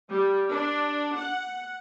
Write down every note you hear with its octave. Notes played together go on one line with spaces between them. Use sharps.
G3
D4
F#5